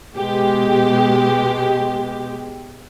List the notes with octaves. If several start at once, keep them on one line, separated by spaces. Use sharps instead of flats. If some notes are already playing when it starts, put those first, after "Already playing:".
B2 G#3 G4